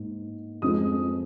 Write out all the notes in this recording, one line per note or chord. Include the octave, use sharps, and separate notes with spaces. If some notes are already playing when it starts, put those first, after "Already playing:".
Already playing: G#2 A#3
F2 F3 G#3 D#6